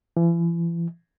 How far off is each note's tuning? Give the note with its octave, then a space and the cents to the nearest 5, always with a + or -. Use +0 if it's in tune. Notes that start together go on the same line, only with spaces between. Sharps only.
E3 +40